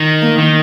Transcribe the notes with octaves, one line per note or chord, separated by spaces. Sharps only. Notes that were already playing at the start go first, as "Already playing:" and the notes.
Already playing: D#3
A#3
D#3